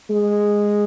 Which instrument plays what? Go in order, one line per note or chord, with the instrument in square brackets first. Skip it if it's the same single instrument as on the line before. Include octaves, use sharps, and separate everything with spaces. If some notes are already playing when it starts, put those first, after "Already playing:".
[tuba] G#3